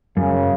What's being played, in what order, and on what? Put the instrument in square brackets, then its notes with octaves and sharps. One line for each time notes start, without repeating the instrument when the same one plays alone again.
[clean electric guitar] F#2 [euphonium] C#3